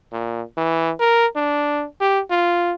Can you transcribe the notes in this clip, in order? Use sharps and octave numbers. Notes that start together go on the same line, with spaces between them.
A#2
E3
A#4
D4
G4
F4